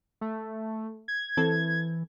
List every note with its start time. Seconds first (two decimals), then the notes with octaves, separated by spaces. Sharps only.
0.21 A3
1.08 G#6
1.37 E3 C4 A4